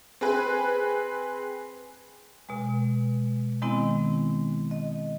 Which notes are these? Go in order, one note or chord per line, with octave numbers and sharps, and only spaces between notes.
C4 G#4 B4
B2 G#3
D#3 G#3 B3 C4 E4
D#5